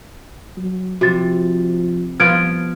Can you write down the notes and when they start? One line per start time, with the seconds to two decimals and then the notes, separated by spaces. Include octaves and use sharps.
0.57 F#3
1.01 C3 F3 F#4 A6
2.20 C2 F3 B3 F4 F6 G#6 D7